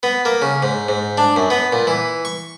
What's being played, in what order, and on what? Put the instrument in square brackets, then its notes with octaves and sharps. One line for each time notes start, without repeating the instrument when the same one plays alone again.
[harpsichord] B3
A#3
C#3
G#2
G#2
D4
F#2
B3
A#2
E3
C#6